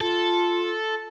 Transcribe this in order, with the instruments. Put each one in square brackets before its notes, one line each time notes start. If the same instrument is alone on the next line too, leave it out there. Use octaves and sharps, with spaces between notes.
[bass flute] F4 [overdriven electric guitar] A4